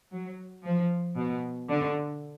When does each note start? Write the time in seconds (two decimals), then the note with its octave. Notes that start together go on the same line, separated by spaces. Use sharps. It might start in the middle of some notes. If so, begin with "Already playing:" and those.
0.12 F#3
0.65 F3
1.17 B2
1.70 D3